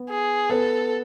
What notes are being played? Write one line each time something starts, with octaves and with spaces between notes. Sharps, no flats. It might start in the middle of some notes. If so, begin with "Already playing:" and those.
Already playing: B3 B4
G#4
B3 A4 B4